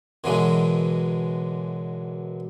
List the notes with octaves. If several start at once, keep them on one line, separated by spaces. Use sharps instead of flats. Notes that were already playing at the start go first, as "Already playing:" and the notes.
F#2 B2 D3 E3 F#3 G#3